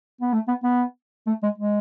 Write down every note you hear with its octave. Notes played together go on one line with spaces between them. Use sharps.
B3
A3
B3
B3
A3
G#3
G#3